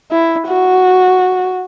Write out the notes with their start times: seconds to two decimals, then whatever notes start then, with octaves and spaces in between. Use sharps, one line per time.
0.11 E4
0.47 F#4